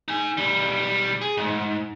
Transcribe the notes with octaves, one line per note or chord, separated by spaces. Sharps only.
D#4 G#5
B1 G3
G#4
G#2